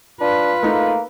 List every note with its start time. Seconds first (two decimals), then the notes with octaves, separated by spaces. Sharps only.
0.21 D4 F4 B4
0.63 A3 A#3 D#4